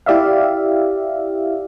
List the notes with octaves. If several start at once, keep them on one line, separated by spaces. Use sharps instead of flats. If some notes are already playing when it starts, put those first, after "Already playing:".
E4 G4 D5 E5 F5